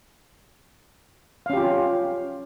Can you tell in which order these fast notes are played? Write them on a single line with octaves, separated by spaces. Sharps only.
F5 C#4 G4 F4